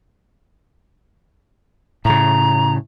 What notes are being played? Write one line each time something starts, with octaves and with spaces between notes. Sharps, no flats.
A2 C#3 A#5